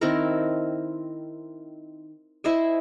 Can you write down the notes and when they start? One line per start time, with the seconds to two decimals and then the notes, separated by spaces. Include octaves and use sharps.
0.01 D#3 C4 E4 A#4
2.44 E4 C5 D#5 G#5